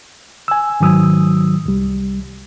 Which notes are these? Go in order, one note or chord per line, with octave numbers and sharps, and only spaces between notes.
G#5 E6
G#2 D#3 F#3 D#6 E6
C2 G3